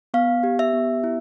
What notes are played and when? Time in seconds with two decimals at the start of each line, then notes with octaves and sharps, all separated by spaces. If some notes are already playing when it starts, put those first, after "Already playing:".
0.14 B3 F5
0.43 G4
0.59 E5
0.73 B3
1.04 E4